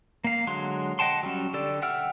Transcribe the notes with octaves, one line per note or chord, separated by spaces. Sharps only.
A#3 F5
D3 F#3 G#3 C6
D#5 F#5 G5 A5 C6
F#3 G3 C#4
D3 G4 A4 D5
E5 F#5 G5 E6 F6